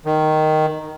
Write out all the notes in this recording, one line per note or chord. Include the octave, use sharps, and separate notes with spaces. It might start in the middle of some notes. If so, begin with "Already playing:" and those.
D#3